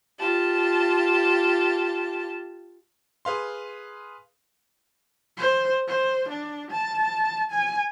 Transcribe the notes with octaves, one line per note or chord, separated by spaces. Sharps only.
F4 G4 A5
G#4 B4 F5 C6
C5
C5
D4
A5
G#5